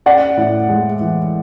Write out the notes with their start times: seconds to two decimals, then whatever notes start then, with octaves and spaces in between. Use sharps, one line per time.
0.06 C#4 D5 F#5
0.37 A2
0.69 G#3
1.00 E3